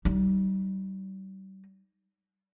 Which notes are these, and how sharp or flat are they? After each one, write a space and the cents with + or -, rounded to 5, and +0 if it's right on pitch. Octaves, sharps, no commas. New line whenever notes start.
G3 -40 D#4 +0